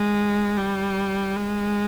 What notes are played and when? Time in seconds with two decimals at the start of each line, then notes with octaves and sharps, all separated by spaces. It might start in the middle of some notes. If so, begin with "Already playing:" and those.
Already playing: G#3
0.57 G3
1.36 G#3